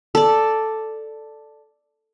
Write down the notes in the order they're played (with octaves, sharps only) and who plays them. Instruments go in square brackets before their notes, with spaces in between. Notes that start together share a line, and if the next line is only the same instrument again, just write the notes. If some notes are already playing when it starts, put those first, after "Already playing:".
[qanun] A4 D5